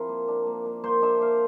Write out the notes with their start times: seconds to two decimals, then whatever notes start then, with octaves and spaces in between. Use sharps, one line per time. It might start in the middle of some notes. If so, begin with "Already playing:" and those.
Already playing: F3 C4 E4 A#4
0.09 A#3
0.28 D4
0.47 A#3
0.66 A#3
0.84 A#3 C5
1.02 D4 E5
1.20 A#3 F5